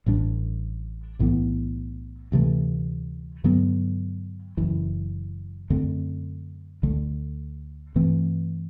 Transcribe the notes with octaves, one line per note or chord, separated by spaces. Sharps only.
A1 A2 G3 D4
B1 A2 E3 B3
D2 C3 E3 A3
G2 D3 F#3 B3
F#1 F#2 E3
F#2 D3 A3 C4
D2 D3 A3
G2 E3 A3 C4